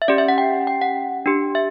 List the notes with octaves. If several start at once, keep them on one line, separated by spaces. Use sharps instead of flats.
E5
C#4 G4 D5
E5
F#5
G5
G5
F#5
D4 G4
E5